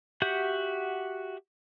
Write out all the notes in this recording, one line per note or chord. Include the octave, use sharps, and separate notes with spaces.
F#4 G4 E5 F#5 G6